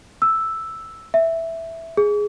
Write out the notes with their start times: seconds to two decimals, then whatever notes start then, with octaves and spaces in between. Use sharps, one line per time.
0.22 E6
1.14 E5
1.97 G#4